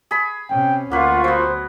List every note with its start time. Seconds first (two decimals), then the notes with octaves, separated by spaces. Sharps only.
0.11 G#4 B5
0.50 C3 C#4 G5
0.91 D2 A#3 F4 B4 F#5 C#6
1.24 F#3 B3 C5